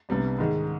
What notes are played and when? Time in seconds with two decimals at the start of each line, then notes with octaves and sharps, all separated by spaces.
0.09 C2 C3 G3 B3 D4
0.38 G#2 D#3 G#3